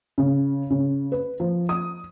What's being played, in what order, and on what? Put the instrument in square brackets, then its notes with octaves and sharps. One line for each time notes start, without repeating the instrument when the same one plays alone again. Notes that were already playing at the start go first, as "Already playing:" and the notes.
[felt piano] C#3
C#3
B4
F3
D#6